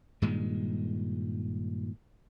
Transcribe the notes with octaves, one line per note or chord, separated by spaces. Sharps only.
G2 A#2 D#3 G#3